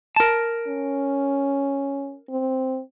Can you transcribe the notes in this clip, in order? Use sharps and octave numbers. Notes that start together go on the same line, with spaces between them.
A#4 A5
C#4
C4